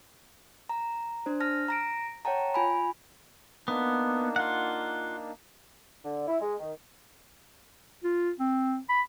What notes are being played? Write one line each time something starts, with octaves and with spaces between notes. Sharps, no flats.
A#5
D4 C5
A5 F6 A#6
A#5 A#6 D7
C#5 F#5 G5 A5 A#5
F4 G#5 B5
A#3 B3 D4 D#4
F4 F#5
D3
E4
G#3
D#3
F4
C4
B5